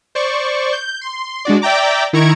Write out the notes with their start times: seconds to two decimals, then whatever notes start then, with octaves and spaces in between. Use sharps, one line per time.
0.15 C5 D5 C#6
0.73 G6
1.01 C6
1.45 G#3 D4 F#4 D5
1.62 D5 E5 G5 A#5 D6
2.13 D#3 E4 A#5 C#6 G#6 D7